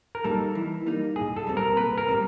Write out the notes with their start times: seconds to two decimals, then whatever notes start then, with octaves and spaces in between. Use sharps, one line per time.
0.15 A#4
0.24 G3 A#3 D#4 A4
0.55 E3
0.86 G3 A#3 D#4
1.16 A#2 G#4
1.36 A4
1.47 G3 C4
1.57 A#4
1.77 A#2 B4
1.98 A#4
2.08 G3 C4